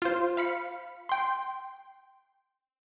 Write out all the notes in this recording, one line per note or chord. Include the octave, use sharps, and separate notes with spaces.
F4 C5
F5 B5 C#7
G5 C6